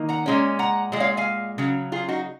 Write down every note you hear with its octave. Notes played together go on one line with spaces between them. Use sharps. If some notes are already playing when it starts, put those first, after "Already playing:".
Already playing: D#3 A#3 D#4
F#5 A#5
A#2 G#3 C#4
F#5 A#5
A#2 G#3
C#5 F5
F5 G#5
C#3 F#3
F4 G#4
D#4 F#4